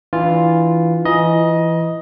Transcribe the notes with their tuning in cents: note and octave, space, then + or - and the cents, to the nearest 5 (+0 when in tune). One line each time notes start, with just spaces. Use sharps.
E3 +0 D4 +0 F4 +0
E3 +15 D#5 +10 A#5 +45